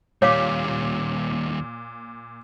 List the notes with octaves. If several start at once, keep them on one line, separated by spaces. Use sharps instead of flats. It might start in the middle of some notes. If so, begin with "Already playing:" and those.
D#2 A#2 G3 C#5 F5 D6